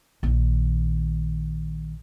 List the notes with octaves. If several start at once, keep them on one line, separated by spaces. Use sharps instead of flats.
A#1 D#3